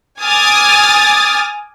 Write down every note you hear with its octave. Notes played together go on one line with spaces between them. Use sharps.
G#5 D6 D#6 F6 A6